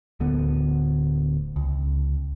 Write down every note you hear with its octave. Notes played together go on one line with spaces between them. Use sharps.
D1 D2 D3 B3
C#2